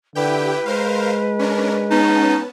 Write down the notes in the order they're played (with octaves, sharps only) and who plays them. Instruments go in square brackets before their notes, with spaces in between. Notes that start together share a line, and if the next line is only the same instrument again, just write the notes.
[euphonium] D3 [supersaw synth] E4 G4 G5 [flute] B4
[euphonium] G#3 [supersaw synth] A#4 C5 F5
[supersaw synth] C#4 D4 A#4
[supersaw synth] B3 C#4 A5 [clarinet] D#4